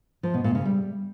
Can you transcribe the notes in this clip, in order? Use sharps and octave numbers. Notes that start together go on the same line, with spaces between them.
F3
B2
A#2
C#3
G3